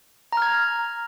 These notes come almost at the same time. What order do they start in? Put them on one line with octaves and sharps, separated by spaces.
A#5 F6 G#6